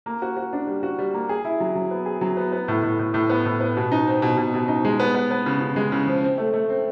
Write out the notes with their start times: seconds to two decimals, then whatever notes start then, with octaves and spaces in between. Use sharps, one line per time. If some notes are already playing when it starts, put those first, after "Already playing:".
0.06 A#3
0.22 F#4
0.37 F#4
0.53 D4
0.67 G3
0.83 F#4
0.99 G3
1.14 A#3
1.29 G#4
1.45 E4
1.60 F#3
1.75 F#3
1.91 B3
2.06 G#4
2.21 F#3
2.37 B3
2.53 B3
2.68 A2
2.83 A2
2.99 A2
3.14 A2
3.30 B3
3.45 A2
3.61 B3
3.77 B2
3.92 D#4
4.07 C4
4.22 B2
4.37 B2
4.54 B2
4.68 D#4
4.85 G#3
5.00 B3
5.15 B3
5.31 B3
5.46 C#3
5.61 C#3
5.76 G#3
5.92 C#3
6.07 F3
6.23 C4
6.38 A3
6.54 A3
6.70 C4